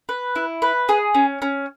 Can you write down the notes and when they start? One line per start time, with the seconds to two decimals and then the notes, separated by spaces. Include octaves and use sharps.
0.09 B4
0.36 E4
0.62 B4
0.89 G#4
1.14 C#4
1.42 C#4